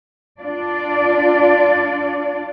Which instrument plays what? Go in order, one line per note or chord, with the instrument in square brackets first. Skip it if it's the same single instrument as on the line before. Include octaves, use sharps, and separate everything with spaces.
[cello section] D4 F4 D5